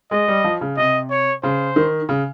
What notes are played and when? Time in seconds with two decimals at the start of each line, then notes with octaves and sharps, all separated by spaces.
0.11 G#3 D#5
0.28 G3
0.44 F3
0.61 C#3
0.77 C3 D#5
1.10 C#5
1.43 C#3 C5
1.76 D#3
2.09 C#3